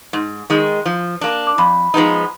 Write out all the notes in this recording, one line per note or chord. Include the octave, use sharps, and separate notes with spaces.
G#2
D#3 G#3
F3
A#3 D4
D6
F2 B5
F3 G#3 B3 D#4